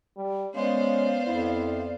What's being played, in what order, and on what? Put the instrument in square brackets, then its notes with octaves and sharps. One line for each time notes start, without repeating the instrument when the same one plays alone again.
[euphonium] G3
[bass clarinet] G#3 [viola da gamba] B3 C5 [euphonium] C#4 [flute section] D5 F5
[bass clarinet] F2 [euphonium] E4